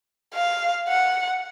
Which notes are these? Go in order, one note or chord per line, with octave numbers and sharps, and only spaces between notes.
F5
F#5